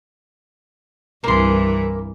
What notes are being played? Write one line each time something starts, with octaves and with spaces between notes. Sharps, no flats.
C2 G2 E3 A#3 C6